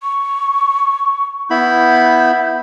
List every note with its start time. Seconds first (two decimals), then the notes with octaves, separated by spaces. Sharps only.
0.03 C#6
1.50 B3 E4 B5 G6